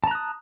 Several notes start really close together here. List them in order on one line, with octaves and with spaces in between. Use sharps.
A5 A#5 F#6 D#6